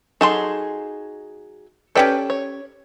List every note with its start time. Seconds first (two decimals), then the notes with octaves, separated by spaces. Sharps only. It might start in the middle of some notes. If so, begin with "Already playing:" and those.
0.21 F#3 D#4 G#4 A4 A5 C6
1.95 C#4 G4 A4 B4 D5 G5
2.30 C#5